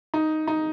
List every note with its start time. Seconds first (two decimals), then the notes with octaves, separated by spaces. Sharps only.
0.14 D#4
0.47 D#4